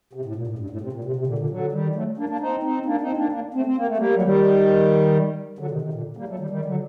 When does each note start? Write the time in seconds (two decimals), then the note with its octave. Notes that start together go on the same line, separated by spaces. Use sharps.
0.13 C3
0.25 A2
0.35 A#2
0.47 A2
0.59 G2
0.70 A2
0.81 C3
0.93 A#2
1.04 C3
1.16 C3
1.27 A#2 D3
1.38 A#2 D3
1.50 D3 F#3
1.72 D#3 G3
1.95 F#3 A3
2.17 A#3 D4
2.29 A#3 D4
2.40 C4 D#4
2.63 C4 D#4
2.86 A#3 D4
3.01 C4 D#4
3.17 A#3 D4
3.32 A#3 D4
3.54 A3 C4
3.66 C4
3.77 A#3
3.87 A3
3.97 G3 A#3
4.15 F#3
4.22 D#3 G3
5.59 D3 F#3
5.70 C3 D#3
5.82 C3 D#3
5.93 A#2 D3
6.17 G3 A#3
6.28 F#3 A3
6.39 D#3 G3
6.50 D#3 G3
6.65 D3 F#3